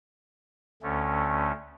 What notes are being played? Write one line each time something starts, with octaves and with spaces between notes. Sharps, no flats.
D2 D3 A3 C#4